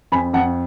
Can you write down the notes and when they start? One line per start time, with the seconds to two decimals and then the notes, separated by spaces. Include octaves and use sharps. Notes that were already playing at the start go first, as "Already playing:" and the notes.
0.12 F2 G#5 B5
0.33 F2 F#5 A5